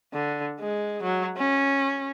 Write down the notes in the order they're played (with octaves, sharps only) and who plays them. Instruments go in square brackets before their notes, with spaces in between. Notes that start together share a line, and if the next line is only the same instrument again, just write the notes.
[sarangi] D3
G#3
F#3
C#4